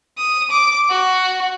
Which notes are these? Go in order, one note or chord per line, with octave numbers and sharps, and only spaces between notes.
D#6
D6
F#4